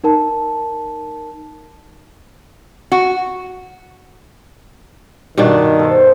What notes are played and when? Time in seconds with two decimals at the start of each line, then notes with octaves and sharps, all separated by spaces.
0.04 D#4 A#4 A5
2.92 F#4
5.37 G2 B2 D#3 D4
5.79 A4 C5